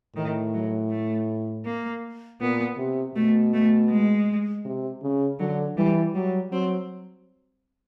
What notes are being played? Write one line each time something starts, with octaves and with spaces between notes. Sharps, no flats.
A2 D#3
F#3
A3
A#3
A#2 B3
C3
B2 A3
A3
G#3
C3
C#3
D3 F#3
E3 G3
F#3 G3
F#3 C4